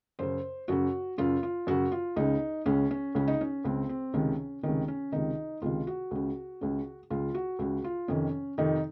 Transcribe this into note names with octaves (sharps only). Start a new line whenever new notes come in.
F#2 C#3 C5
F#2 C#3 F#4
F#2 C#3 F4
F4
F#2 C#3 F#4
F4
C#2 C#3 D#4
C#2 C#3 C#4
C#4
C#2 C#3 C#4
D#4
C#4
C#2 C#3 C4
C4
C#2 C3 D#3 C#4
C#2 C3 D#3 C#4
C#4
C#2 C3 D#3 D#4
C#2 C3 D#3 F4
F#4
C#2 C#3
C#2 C#3
C#2 C#3 F4
F#4
C#2 C#3 F#4
F4
F2 C3 D#3 C#4
F2 C3 D#3 D#4